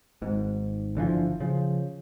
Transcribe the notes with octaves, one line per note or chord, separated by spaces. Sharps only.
G#1 G#2
G1 D3 E3 F3
C#3 F3